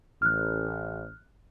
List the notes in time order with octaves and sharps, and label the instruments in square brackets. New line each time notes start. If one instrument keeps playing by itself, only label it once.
[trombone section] A1 [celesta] F6 F#6